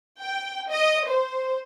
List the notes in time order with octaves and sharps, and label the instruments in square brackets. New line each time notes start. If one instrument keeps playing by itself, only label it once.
[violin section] G5
D#5
C5